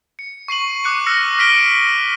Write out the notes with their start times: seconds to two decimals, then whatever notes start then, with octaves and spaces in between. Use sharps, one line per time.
0.19 C#7
0.48 C#6 C7 D#7 F#7
0.84 D6 F#6 C#7 D#7
1.06 E6 F6 A#6 C#7
1.39 F6 B6 C7 D7 D#7 G7